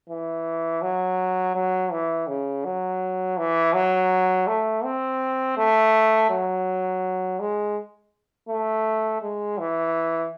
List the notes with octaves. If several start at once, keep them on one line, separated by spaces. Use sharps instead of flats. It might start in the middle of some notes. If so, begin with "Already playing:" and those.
E3
F#3
F#3
E3
C#3
F#3
E3
F#3
A3
C4
A3
F#3
G#3
A3
G#3
E3